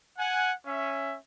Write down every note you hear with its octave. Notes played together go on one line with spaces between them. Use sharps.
F#5 G#5
C#4 E5